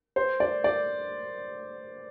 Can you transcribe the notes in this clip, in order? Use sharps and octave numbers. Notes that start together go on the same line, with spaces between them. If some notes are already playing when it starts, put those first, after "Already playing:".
C5
D5
D5